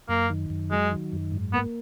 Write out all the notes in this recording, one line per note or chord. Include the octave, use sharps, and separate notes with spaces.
F#2 A#3
D#3
F#2
F#3 G#3
D#3
F#2
G#2
A#3 B3